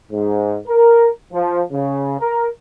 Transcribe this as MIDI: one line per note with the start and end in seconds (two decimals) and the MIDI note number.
0.11 0.56 44
0.67 1.08 70
1.33 1.61 53
1.72 2.15 49
2.20 2.46 70